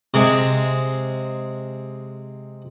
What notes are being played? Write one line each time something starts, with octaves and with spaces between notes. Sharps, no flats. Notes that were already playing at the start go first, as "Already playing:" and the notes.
C3 G#3